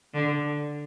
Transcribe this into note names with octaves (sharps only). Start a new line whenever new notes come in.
D3